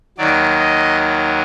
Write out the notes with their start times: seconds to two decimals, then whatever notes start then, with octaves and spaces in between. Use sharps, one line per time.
0.18 D#2 D#3 F#3 D5
0.59 D#5